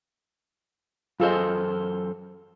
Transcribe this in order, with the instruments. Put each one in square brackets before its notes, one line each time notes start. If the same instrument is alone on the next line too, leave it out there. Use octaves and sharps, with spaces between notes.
[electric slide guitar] F#2 A4 C5 [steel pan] F4 G#4 D#5